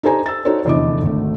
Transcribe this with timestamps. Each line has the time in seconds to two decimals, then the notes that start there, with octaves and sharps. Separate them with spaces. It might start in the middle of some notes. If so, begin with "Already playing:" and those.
0.03 D#4 G4 A4 C5 G#5 A#5
0.26 E6 A6
0.45 D#4 F#4 A4 C5 C#5
0.65 F1 E2 D3 E4 D#5 D6
1.01 G#1 D2 A3